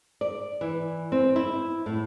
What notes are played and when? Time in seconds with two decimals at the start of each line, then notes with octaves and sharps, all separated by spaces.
0.21 D5
0.61 E3
1.12 C4
1.36 E4
1.86 A2